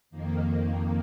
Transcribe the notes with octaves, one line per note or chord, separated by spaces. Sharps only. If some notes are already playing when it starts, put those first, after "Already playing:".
F2 D#3 A#3